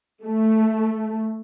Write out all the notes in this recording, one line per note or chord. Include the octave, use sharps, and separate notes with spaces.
A3